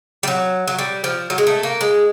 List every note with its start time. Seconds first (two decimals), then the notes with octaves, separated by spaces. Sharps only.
0.23 G3
0.28 F#3
0.68 F#3
0.78 G3
1.04 F3
1.30 F#3
1.38 G#3
1.47 A3
1.63 A#3
1.81 G#3